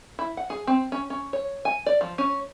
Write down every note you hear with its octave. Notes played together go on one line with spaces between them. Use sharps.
E4
F#5
G#4
C4
C#4
C#4
C#5
G#5
D5
F3
C#4